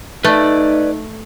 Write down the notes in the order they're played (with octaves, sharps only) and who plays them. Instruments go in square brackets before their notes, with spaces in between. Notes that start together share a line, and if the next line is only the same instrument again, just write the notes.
[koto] A3 [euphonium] D#4 [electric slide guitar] B4 D5